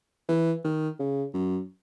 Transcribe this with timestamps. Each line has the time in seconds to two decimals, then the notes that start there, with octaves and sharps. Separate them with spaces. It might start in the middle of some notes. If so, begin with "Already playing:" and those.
0.29 E3
0.65 D#3
0.99 C#3
1.34 F#2